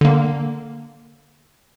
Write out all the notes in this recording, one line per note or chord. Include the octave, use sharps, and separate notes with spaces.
D3 A#3